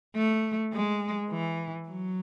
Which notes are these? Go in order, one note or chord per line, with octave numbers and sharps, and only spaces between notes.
A3
G#3
E3
F#3